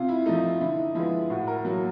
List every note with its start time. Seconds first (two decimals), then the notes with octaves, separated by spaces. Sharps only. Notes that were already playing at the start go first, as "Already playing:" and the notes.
Already playing: C3 F4
0.09 E4
0.26 F3 A3 D#4
0.44 E4
0.61 D3 E4
0.78 D#4
0.95 F3 G#3 B3 E4
1.30 A2 F#4
1.47 A#4
1.65 F#3 A#3